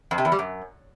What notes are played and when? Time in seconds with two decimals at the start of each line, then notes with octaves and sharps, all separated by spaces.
0.11 F2
0.18 C3
0.25 E2
0.32 G3
0.39 F#2